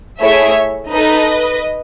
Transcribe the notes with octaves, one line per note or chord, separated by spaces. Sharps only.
A3 E4 G#4 C#5 E5
D#4 A4 B4 D#5